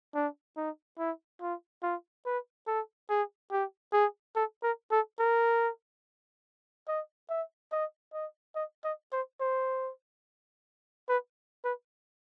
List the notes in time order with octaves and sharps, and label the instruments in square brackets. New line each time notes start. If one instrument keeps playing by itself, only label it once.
[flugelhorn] D4
D#4
E4
F4
F4
B4
A4
G#4
G4
G#4
A4
A#4
A4
A#4
D#5
E5
D#5
D#5
D#5
D#5
C5
C5
B4
B4